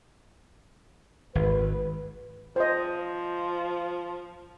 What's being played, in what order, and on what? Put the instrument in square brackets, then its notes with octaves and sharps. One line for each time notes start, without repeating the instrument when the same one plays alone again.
[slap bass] G#1 [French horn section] B4
[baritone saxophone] F3 [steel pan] C5 D#5